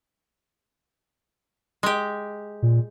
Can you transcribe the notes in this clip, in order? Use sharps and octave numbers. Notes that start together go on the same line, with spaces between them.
G#3 G4
A#2